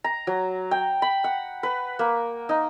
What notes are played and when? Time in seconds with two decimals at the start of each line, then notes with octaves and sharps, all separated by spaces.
0.04 A#5
0.27 F#3
0.71 G5
1.02 B5
1.24 F#5
1.63 B4
1.99 A#3
2.49 D#4